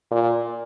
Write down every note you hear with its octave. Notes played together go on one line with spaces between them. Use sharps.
A#2